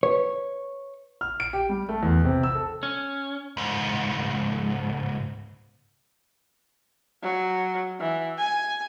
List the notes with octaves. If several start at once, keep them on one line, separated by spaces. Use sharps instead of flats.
B4 C#5
F6
D7
G4
G3
A3
E2
C3
E6
A4
C#4
C#2 G#2
F#3
E3
G#5